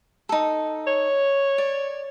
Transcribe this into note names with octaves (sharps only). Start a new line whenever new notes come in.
D#4 A4
C#5
D5